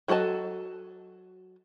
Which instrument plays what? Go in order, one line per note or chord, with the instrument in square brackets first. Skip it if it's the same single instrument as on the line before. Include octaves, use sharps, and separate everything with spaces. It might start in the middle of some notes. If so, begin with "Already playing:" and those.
[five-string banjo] F#3 F#4 A4 D#5 A5